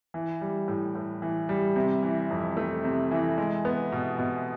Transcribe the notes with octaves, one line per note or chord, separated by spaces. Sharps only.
E3
G3
A2
A2
E3
G3
C3
E3
F2
A3
C3
E3
G#3
B3
B2
B2